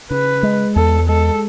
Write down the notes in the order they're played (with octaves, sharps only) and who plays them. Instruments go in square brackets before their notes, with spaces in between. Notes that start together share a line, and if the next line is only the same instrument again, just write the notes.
[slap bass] C#3 [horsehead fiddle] B4
[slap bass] G#3
[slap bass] E2 [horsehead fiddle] A4
[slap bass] G#3 [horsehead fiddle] A4